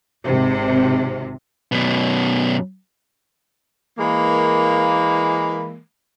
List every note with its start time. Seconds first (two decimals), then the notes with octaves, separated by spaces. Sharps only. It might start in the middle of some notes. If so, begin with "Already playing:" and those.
0.25 G#1 C3
1.72 F#2 B2
3.98 E3 G#3 A#3